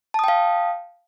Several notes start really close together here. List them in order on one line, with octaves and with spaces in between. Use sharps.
A5 D#6 G5 F5